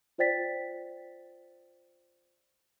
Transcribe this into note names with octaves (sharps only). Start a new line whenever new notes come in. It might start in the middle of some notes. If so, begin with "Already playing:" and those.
F4 C5 D5 G5 A6 B6